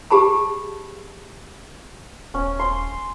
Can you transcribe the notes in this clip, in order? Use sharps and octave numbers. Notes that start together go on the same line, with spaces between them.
G4 G#4 A5 B5
D#1 C#4
C6